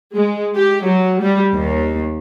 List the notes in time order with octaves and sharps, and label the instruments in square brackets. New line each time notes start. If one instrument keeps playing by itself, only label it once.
[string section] G#3
G4
F#3
G3
D#2